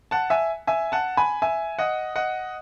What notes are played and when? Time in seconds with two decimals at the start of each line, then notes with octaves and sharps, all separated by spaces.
0.11 F#5 A5
0.30 E5 G#5
0.67 E5 G#5
0.92 F#5 A5
1.17 G#5 B5
1.42 E5 G#5
1.79 D#5 F#5
2.16 D#5 F#5